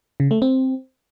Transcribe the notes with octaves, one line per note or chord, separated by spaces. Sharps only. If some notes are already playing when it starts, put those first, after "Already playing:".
C#3
A3
C4